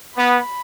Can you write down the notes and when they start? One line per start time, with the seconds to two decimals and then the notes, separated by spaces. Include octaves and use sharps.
0.18 B3 B5